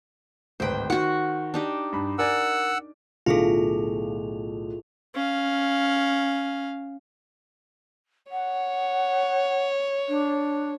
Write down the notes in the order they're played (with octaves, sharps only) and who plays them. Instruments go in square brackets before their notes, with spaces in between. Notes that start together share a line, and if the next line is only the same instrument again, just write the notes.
[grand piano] D1 G#1 B4 [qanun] C5 G5
[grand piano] D#3 [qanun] F#4 F#5
[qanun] D4 D#4 G4
[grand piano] G2 B5
[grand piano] A#4 D5 G#5 [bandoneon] F#5 E6
[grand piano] B1 A2 D3 [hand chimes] E4 G#4 A4 [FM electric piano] F4
[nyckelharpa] C#4 F5
[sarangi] C#5 [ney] F#5
[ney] D4